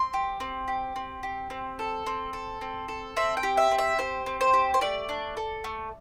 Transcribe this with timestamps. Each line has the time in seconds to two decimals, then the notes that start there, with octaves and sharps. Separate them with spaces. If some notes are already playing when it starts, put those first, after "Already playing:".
Already playing: C4 C6
0.13 G4
0.40 C4
0.68 G4
0.96 C4
1.23 G4
1.50 C4
1.79 A4
2.06 C4
2.33 A4
2.61 C4
2.88 A4
3.16 C4 E5
3.37 G5
3.43 G4
3.57 E5
3.71 C4
3.78 E5
3.99 G4 C5
4.26 C4
4.41 C5
4.53 G4
4.74 C5
4.81 A3 D5
5.09 D4
5.37 A4
5.64 A3